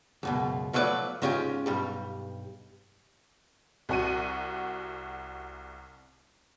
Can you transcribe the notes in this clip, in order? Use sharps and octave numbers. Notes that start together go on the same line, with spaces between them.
C#2 F#2 B2
F3 F#3 A3 E4 B4 D5
G#2 G#3 C#4 F4 G4 G5
B1 G2 G3
C2 F#4 D#7